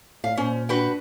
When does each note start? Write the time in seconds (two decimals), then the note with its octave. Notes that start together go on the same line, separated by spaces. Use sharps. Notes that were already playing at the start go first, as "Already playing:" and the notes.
0.24 A2 F5
0.37 A#2 C#4 C5
0.69 D4 F#4 B4 G5